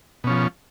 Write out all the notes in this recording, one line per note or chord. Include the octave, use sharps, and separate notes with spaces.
B2 F3 C#4